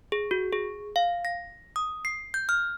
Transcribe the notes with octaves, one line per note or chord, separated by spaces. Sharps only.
G#4
F#4
G#4
F5
A#6
D#6
C7
G6
F6